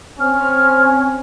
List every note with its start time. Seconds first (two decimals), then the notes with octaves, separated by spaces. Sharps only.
0.19 C4 C#4 F6